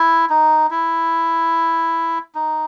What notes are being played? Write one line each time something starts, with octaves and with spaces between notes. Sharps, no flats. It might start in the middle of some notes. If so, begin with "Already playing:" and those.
Already playing: E4
D#4
E4
D#4